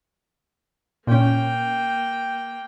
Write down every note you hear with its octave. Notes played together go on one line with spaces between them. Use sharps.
A#2 A#3 C#4 G5